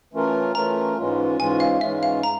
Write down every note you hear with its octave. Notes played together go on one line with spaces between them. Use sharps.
E3 A3 C#4 F4 A#4
E3 A3 C#4 F4 A#4 A#5
G#2 E3 G#3 C#4 F4
G#2 E3 G#3 C#4 F4 G#5
F5
G#2 E3 G#3 C#4 F4 E5
F5
A#5